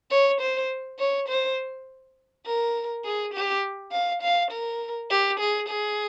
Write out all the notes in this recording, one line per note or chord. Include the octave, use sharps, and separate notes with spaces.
C#5
C5
C#5
C5
A#4
G#4
G4
F5
F5
A#4
G4
G#4
G#4